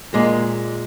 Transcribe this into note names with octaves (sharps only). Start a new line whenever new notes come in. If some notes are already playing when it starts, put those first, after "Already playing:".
A#2 G#3